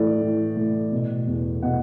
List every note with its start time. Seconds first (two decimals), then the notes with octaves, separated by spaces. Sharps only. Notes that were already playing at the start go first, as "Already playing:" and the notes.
Already playing: A2 E3 D5
0.22 E3
0.57 A2
0.92 B2
1.27 E2
1.62 B2 F#5